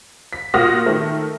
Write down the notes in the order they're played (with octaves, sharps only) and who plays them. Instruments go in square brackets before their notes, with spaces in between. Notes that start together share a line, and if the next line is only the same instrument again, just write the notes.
[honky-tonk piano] B6
A#2 F4 F#4 D#6 F6 A#6
D#3 A3